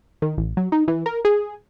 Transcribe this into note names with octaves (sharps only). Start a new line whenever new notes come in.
D#3
A1
F#3
D#4
E3
A#4
G#4